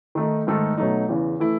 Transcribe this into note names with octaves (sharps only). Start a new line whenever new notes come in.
D#3 A3 D#4
G#2 D#3 A3 D#4 A4
B2 F#3 A3 D#4
E2 C#3 E3
E3 A3 E4